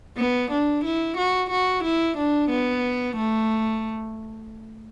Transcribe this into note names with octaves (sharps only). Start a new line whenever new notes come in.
B3
D4
E4
F#4
F#4
E4
D4
B3
A3